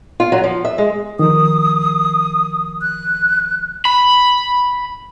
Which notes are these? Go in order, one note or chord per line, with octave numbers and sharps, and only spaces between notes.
F4
F#3
F3
E5
G#3
D#3 F3 A#4 D#6
F#6
B5